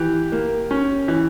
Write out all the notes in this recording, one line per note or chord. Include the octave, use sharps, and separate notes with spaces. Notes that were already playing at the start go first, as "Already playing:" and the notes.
Already playing: E3 G4
A#3
C#4
E3